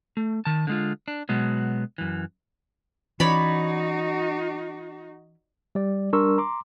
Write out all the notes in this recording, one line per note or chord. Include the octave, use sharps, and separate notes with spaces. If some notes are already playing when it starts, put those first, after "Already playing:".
A3
D#3 A5
D3 G#3 F4
D4
B2 F#3 G#3 B3
F#2 E3
E3 C#4 D#4 F#4 C#5 D5 B5
G3 D5
G3 D4 A#4 C6 C#6 E6
A#5 C6 D6